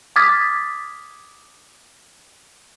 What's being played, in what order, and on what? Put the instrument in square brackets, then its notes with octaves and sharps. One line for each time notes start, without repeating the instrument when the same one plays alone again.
[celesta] D6 D#6 F6 G#6 A6 B6